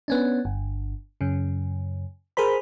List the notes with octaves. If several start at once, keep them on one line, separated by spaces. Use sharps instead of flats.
B3 C#4 D4
G1
F#2 C#3
G#4 A#4 C5 B5